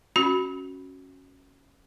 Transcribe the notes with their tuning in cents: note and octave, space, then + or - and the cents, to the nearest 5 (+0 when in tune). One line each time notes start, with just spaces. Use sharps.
C#4 -5 F#4 +0 B5 +0